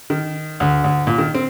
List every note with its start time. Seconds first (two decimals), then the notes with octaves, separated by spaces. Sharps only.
0.10 D#3
0.60 D2
0.84 D2
1.07 A#2
1.18 D#3
1.35 C4